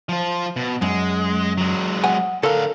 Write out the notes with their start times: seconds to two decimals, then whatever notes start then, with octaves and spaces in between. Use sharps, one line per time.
0.09 F3 F4
0.56 B2
0.82 F#2 G#3
1.58 F#3 G#3
2.04 F#5 G#5
2.43 D3 A4 A#4 F5